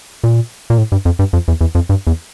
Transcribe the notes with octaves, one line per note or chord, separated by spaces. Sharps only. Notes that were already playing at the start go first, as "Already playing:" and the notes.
A#2
A#2
A2
G2
F2
G2
F2
E2
E2
F2
G2
E2